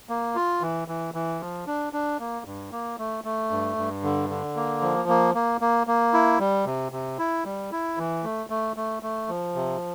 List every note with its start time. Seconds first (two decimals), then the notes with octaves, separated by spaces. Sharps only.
0.09 A#3
0.35 F4
0.61 E3
0.88 E3
1.14 E3
1.40 F3
1.67 D4
1.93 D4
2.19 A#3
2.46 G2
2.72 A#3
2.99 A3
3.24 A3
3.51 G2
3.77 G2
4.03 D3
4.30 D3
4.56 A#3
4.82 F3
5.09 A#3
5.35 A#3
5.61 A#3
5.87 A#3
6.14 E4
6.40 G3
6.66 C3
6.92 C3
7.19 E4
7.45 G3
7.72 E4
7.98 E3
8.23 A3
8.50 A3
8.76 A3
9.03 A3
9.29 F3
9.55 C3